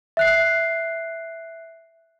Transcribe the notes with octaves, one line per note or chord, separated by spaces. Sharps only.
E5 F#6 C7